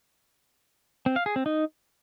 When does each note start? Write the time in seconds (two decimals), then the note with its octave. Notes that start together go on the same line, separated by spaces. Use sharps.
1.06 C4
1.16 F5
1.26 G#4
1.36 C4
1.46 D#4